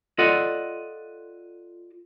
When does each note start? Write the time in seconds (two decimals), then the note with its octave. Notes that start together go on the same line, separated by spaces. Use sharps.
0.18 F4 A4 D5 D#5 F#5